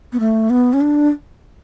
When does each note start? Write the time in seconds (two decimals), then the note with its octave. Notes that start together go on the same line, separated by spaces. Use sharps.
0.13 B3
0.20 A3
0.50 B3
0.73 C#4
0.81 D4